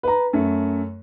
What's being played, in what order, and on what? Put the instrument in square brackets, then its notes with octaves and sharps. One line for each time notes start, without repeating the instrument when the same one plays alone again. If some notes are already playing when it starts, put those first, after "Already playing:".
[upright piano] B4 A#5
F#2 A3